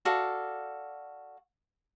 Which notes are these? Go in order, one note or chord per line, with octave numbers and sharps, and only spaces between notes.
F#4 A4 D5 F5